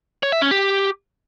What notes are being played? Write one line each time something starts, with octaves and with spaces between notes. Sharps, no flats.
C#5
E5
C#4
G4